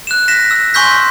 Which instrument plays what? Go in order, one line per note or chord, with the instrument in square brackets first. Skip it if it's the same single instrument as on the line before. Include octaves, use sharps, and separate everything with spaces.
[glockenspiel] F#6 E7
A#6 B6 E7
E6
G#5 C6 C#6 E6 G6 B6